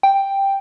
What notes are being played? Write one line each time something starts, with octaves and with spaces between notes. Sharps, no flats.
G5